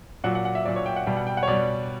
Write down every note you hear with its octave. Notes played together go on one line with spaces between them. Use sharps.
A#2 F#3 F#5
F#5
F#5
E5
A#2 F#3 D5
C#5
G5
F#5
B2 G3 G5
F#5
G5
F#5
C#5
B2 G3 D5